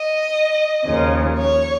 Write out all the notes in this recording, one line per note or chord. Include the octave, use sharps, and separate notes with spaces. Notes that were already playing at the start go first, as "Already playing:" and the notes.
Already playing: D#5
D#2 C#3 F3
C#5